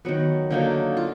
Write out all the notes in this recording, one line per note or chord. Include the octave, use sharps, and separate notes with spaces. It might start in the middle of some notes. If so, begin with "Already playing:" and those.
D#3 F#3 B3
D3 F#3 A#3 D#4
F4